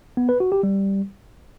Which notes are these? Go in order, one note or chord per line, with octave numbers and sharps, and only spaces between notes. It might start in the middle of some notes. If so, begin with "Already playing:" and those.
B3
B4
F#4
G4
G3